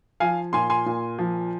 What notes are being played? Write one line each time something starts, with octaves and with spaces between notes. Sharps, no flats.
F3 F5 G#5
A#2 G#5 C6
G#5 C6
A#2
F3